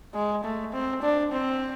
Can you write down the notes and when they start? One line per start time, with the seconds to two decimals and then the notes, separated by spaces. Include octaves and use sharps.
0.15 G#3
0.44 A3
0.73 C4
1.03 D4
1.32 C4